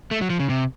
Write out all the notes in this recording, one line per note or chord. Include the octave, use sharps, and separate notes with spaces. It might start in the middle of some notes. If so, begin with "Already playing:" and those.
A3
F#3
F3
C#3
C3